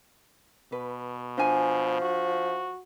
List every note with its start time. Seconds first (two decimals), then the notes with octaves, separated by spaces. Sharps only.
0.72 B2 B4
1.38 F3 D4 G#5
2.02 F#4